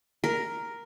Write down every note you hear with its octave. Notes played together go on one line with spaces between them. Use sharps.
A#4